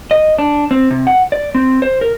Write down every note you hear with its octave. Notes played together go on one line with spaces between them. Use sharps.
D#5
D4
C4
C3
F#5
D5
C4
C5
A#4